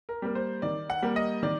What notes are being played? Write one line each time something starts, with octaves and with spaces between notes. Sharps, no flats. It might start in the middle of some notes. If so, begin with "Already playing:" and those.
A#4
G3 A#3
C5
D#3 D5
F#5
G3 A#3
D#5
D#3 D5